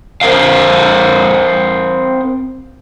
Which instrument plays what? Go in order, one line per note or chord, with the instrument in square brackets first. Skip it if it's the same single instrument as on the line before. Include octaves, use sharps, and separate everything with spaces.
[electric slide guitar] C4 A#4 C5 F5